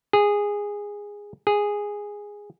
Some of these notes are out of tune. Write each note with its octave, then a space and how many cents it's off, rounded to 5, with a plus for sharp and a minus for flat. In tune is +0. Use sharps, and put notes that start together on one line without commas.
G#4 -15
G#4 -10